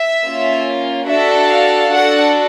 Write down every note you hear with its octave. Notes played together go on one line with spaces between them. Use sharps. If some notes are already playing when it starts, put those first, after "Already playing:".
Already playing: E5
A#3 C#4 F4
D4 F#4 A4 E5
F5
D4 F#4 A4 F#5